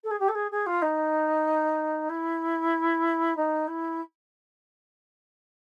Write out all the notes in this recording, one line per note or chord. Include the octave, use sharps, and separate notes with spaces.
A4
G#4
G4
A4
G#4
G#4
F4
D#4
E4
D#4
E4